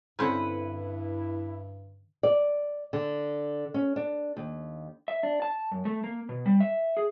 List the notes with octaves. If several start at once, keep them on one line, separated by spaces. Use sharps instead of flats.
G2 D3 C4 C#4 E4 B4 F#5
D5
D3
C#4
D4
D#2
E5
D4
A5
F#2
A3
A#3
B2
G3
E5
G#4